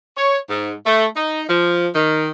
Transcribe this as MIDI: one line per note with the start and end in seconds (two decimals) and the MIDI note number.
0.17 0.38 73
0.49 0.71 44
0.86 1.06 57
1.16 1.42 63
1.49 1.87 53
1.95 2.29 51